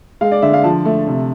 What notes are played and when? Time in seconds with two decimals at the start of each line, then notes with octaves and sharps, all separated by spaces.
0.21 G#3 F5
0.32 D5
0.42 D3 E5
0.53 F5
0.64 F3 A5
0.85 A3
1.07 C3